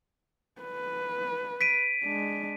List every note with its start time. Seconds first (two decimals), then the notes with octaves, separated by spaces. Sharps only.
0.61 B4
1.61 B6 D7 D#7
2.04 G#3 D4